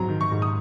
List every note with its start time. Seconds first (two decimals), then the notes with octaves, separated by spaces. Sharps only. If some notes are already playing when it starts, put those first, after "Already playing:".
Already playing: G#2 F#3 C4 A#5
0.09 D#3
0.21 C#6
0.32 G#2
0.42 D#6